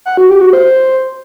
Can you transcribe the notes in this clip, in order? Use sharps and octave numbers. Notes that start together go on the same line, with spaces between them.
F#5
F#4
G4
F#4
C5